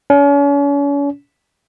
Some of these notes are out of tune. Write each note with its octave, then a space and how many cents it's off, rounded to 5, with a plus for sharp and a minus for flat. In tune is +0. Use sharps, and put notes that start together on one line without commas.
C#4 +40